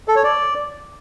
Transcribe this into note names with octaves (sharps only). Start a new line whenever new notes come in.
A4
C#5
D5